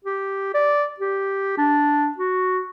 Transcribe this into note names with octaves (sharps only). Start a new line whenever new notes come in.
G4
D5
G4
D4
F#4